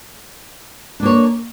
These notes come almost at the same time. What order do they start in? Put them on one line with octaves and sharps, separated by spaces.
D4 A#3 C#5